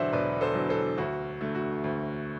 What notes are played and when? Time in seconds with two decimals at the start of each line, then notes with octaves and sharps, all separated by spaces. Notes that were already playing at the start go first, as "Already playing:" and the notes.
Already playing: E1 E2 D3 F#3 C5 D5 E5 F#5
0.13 E1 B4 D5
0.41 A4 C5
0.55 E2 D3 F#3
0.69 A4 C5
0.98 D2 F#4
1.41 D3 A3
1.55 F#4
1.84 D2